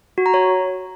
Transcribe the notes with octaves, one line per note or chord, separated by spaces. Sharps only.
F#4
A#5
C#5